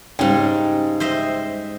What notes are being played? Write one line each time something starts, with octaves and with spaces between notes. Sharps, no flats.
G#2 C#3 G3 C#4 G5
C5 D#5 E5